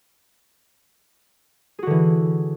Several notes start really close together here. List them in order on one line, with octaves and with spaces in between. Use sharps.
G#4 F#4 D3 E3